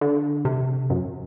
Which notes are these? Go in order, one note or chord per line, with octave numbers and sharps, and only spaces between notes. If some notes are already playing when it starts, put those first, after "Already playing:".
D3
C3
F#2